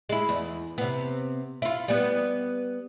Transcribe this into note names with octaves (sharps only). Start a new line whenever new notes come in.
G#3 E4
E2
C3 B3
E4 F4
G3 B3